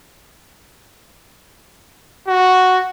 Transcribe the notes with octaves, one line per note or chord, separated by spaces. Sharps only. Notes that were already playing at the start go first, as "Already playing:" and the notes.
F#4